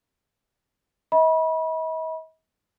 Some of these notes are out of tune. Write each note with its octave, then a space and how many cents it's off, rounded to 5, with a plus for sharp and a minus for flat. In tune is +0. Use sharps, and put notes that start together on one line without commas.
D#5 +45 B5 -30